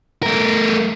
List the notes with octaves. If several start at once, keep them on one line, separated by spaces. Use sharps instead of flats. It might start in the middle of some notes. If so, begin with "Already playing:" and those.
A3 A#4